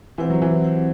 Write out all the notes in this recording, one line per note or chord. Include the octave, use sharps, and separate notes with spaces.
E3 C4 E4 G4 C5 F#5
F#3
E3
C4 E4 G4 C5 F#5